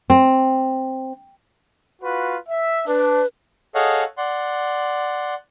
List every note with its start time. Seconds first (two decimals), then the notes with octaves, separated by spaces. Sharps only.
0.10 C4
2.02 F4 F#4 B4
2.49 E5
2.87 D4 B4
3.75 G#4 A4 C#5 D#5 F5 F#5
4.18 D5 F#5 C6